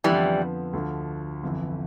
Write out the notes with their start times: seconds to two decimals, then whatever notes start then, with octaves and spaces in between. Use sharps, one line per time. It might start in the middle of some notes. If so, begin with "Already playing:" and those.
0.04 F2 D3 E3 F3 G3 B3
0.73 D2 D3 F3
1.42 G1 F2 E3